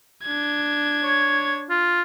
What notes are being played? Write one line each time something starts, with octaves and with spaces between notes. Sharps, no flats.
D4 G#6
C#5
F4